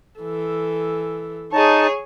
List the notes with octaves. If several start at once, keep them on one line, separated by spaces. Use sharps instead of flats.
E3 A4
D#4 G#4 C#5 A5